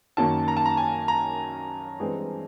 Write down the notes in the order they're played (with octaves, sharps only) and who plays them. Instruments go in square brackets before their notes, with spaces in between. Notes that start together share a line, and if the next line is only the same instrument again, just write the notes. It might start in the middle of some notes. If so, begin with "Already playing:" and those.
[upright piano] F#2 D#3 F#3 A#3 C#4 [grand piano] A5
[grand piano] A#5
A5
A#5
G#5
A#5
[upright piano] G2 E3 G#3 C4